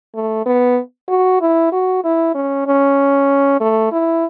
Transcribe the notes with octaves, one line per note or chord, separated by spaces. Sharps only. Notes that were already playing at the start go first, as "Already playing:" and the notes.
A3
B3
F#4
E4
F#4
E4
C#4
C#4
A3
E4